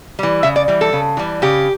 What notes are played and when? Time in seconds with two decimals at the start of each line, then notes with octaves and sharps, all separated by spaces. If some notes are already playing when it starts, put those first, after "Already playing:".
0.19 E3 G3
0.43 C#3 E5
0.56 D5
0.68 E3 G3
0.81 A4
0.93 C#3
1.17 E3 G3
1.42 C#3 G4